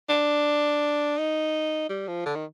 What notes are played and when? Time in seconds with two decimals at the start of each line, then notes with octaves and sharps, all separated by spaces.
0.09 D4
1.18 D#4
1.89 G3
2.08 F3
2.26 D3
2.35 D#3